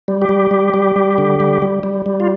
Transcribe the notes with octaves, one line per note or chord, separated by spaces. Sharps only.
G3
G4
G3
G3
G3
G3
D3
G3
G3
G3
G3
F4